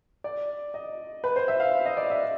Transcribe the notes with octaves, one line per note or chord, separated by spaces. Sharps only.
D5
D#5
B4
C5
E5
F5
D#5
D5
E5